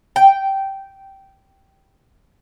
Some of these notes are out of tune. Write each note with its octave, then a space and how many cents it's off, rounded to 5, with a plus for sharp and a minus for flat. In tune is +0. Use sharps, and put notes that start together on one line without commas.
G5 -10